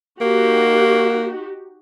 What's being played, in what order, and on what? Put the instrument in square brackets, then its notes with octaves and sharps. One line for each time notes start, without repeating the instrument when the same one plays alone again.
[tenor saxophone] A#3 [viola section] D#4 F#4 G4